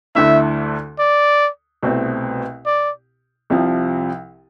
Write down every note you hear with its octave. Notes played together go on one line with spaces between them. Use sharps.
D2 D3 A3 E4 E5
D5
C2 B2 A3 C4
D5
C2 C3 F3